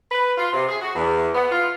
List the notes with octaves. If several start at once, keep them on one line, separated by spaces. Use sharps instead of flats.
B4
F4
C3
G#4
F#4
E2
B3
F4